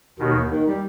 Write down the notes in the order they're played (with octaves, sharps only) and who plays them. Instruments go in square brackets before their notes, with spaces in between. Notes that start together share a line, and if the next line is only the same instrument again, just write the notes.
[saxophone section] D#2 [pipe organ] B2 D#3
[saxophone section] D#2
D#3
G3